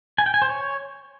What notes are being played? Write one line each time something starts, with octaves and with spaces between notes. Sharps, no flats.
G#5
G5
G#5
C5
C#5